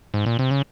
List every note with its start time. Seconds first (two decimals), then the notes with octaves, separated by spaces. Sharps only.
0.14 G#2
0.26 A#2
0.39 C3
0.51 C#3